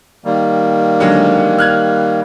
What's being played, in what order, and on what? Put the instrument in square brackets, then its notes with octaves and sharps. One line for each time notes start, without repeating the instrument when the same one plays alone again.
[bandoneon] D#3 G3 A#3
[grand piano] D3 F#3 G#3
F6 F#6 G#6